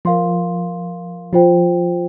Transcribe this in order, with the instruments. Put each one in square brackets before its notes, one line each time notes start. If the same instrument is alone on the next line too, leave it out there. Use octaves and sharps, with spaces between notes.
[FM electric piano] F3 [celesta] A#4 F5 C6
[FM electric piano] F3 [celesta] F4 C5 G5